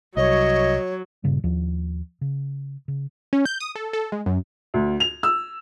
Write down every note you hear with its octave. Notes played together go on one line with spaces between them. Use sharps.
C2 F#3 C#5 D#5
G2 A#2 C#3 G3
D#2 F3
C#3
C#3
C#4
G6
D#6
A4
A4
G#3
F#2
D2
F7
E6